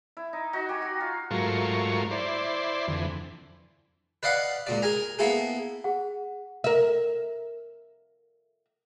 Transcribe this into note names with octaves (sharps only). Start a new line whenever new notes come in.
E4
D#4
D#4 F#4
G4 G#5
F#4
F4
G#2 F#3 A3 F4 A#4 C#6
E4 C5 D5
F2 D3 E3
B4 D5 D#5 F5 F#5 B5
C#2 A#2 D5
G#4 A#4 G#5 A#5
A#3 B3 E4 G#4 A4
G#4 F#5
A#4 E5